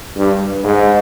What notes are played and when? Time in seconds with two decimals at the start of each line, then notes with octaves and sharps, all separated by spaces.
0.16 G2
0.64 G#2